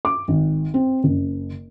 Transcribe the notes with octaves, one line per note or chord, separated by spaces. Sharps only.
D6
G#1
C4
F#1